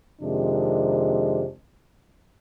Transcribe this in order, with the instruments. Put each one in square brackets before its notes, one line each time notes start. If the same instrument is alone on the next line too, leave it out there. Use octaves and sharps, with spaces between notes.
[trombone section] F2 C3 D#3 G#3 D4